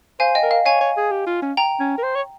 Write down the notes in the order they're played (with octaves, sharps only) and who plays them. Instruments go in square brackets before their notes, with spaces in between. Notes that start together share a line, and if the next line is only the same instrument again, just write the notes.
[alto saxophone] C5 [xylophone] F5 G#5
[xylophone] D#5 G5
[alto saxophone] A#4
[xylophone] F5
[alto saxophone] C#5 [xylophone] F5 G#5
[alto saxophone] C#5
G#4
G4
F4
C#4
[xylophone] G5 A#5
[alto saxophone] C#4
A#4
C5
C#5